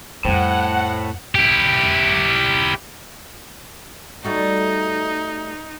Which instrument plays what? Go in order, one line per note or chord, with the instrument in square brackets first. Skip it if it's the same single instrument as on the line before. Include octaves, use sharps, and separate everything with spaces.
[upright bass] F2 G3 [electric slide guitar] A2 [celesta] C5 G5 [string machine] F#5
[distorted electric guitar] E4 G4
[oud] G3 A3 F#4 [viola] D#4